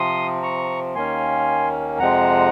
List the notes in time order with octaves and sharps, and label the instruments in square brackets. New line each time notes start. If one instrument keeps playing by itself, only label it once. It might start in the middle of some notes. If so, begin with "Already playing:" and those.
Already playing: [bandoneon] C3 F3 C4 C6 D#6
A#5 C#6
D#2 D#3 A#3 C#4 G#5 C6
F2 C3 F3 G#3 C4 F#5 A#5